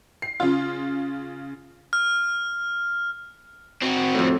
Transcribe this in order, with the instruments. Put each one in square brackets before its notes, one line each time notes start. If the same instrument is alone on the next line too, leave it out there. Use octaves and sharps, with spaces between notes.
[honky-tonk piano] C7
C#3 F4
[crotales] F6
[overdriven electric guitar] C4 F#4
[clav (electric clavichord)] F2 A2